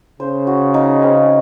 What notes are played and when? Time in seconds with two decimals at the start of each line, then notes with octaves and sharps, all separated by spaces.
0.20 C#3 C5
0.47 F#4
0.74 D#4
1.03 C4